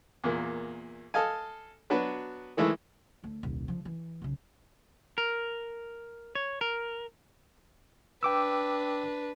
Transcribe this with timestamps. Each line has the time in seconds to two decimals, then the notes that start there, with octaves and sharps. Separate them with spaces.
0.24 E2 A#2 A#3
1.14 A4 D#5 F5 G#5
1.90 F#3 B3 D4 F#4 B4
2.57 D#3 E3 G#3 A3 E4
3.24 D2 A3
3.43 D#1 C2
3.68 D3 F3
3.85 E3
4.22 B1 C#3
5.18 A#4
6.35 C#5
6.61 A#4
8.23 D4 B4 G5 D6 E6